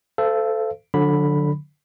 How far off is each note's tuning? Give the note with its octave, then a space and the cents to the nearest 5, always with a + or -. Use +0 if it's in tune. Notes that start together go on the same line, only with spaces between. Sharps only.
A4 +0 C5 -35 F5 -35
D3 +0 F#3 -45 B5 +0